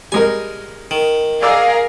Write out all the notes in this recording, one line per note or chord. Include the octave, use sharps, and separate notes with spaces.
G3 G#3 A#4 G#5
D#3
G#4 A#4 D5 F5 D6 E6